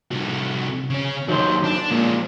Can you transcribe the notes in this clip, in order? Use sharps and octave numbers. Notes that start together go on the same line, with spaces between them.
C2 F#4
C#3 C#5
D#2 F#3 D#4 C5
D4
A#2 F3 G#3